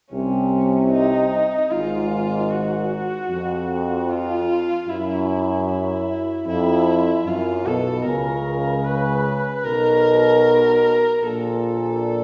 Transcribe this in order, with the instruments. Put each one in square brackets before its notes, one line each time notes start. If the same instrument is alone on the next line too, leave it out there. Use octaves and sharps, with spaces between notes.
[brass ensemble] C2 C3 [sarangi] C#4
[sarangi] D#4
[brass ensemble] G#1 G#2 [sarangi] F4
[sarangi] F#4
[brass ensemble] F2
[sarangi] F4
[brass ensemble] F#2 [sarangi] E4
[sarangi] E4
[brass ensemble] F2 [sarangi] E4
[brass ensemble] F#2 [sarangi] F4
[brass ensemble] B1 B2 [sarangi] A4
[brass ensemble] C#2 C#3 [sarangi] A#4
[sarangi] B4
[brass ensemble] B1 B2 [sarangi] A#4
[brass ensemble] A#1 A#2 [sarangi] A4